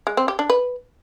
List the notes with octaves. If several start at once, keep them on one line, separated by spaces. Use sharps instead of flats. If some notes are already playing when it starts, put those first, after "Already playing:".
G#3
C4
G4
D4
B4